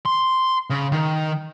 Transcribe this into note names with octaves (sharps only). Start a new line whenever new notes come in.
C6
C#3
D#3